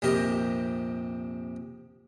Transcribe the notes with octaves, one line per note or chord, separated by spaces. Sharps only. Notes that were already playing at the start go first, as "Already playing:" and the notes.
A#1 F2 C3 G4 A#4 D#5